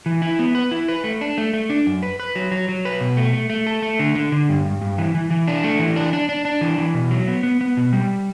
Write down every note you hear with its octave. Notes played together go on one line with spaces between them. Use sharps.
E3
E4
B3
B4
E4
B4
A3
D4
A3
A3
D4
F#2
B4
B4
F#3
F#3
F#3
B4
B2
A3
A3
A3
A4
A3
D3
D3
D3
G2
G2
G2
E3
E3
E3
D4
A3
E3
D4
D4
D4
D4
E3
E3
B2
F#3
B3
B3
B3
B2
G3